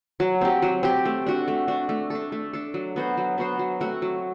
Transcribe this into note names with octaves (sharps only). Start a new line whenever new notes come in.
F#3
C4 G4
F#3
C4 G4
A3
D4 F#4
A3
D4 F#4
A3
D4 A4
A3
D4 A4
F#3
B3 F#4 C5
F#3
B3 F#4 C5
F#3
A3 C4 F#4
F#3